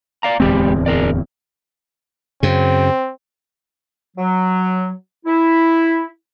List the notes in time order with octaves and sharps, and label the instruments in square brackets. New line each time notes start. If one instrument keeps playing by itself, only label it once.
[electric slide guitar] D5 F5 A#5
[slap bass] D1 E2 C4 [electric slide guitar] G#3 G4
[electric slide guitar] G#4 A#4 D5
[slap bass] F#2 C#3 [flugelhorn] C4
[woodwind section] F#3
E4